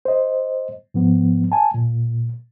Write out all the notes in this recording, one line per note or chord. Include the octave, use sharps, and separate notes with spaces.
C5 D#5
G#2 F3 B3
G#5 A5
A#2